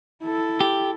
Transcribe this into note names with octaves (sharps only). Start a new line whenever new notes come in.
E4 A4
G4